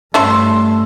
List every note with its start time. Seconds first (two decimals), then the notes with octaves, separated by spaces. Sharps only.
0.14 G2 A3 C#4 E4 A4 C6 E6